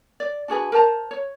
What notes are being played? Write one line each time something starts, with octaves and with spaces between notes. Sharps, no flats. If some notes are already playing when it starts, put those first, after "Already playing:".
D5
D4 F#4 G#4 B4
A#4 C5 A5 A#5
C#5